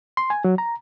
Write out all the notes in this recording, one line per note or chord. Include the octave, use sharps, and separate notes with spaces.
C6
G#5
F#3
A#5